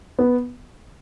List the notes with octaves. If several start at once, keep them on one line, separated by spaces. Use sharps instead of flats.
B3